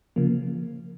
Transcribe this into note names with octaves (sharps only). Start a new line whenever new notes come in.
C#3 F3 A#3